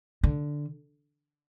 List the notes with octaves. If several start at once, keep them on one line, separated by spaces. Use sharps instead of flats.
D3